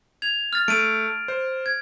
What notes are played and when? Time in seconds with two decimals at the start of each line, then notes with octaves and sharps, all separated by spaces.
0.22 G#6 F7
0.53 F6 A6
0.68 A3 D7 D#7
1.28 C5
1.66 G#6